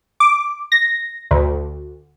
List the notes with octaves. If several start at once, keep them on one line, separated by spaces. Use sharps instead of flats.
D6
A#6
D2